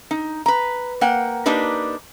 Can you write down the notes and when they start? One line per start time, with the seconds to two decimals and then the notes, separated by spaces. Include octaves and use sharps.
0.11 D#4
0.46 B4 A#5
1.01 A#3 F#5 G5
1.46 A#3 D4 D#4 G4 B4